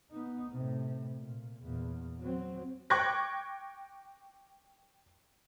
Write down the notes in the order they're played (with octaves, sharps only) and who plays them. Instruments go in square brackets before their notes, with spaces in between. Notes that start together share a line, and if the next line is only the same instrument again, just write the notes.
[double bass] B3 D#4
A2 C3
A#2
E2 A#2
F#3 C4
[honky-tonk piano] G5 C#6 D6 F#6 G#6 A#6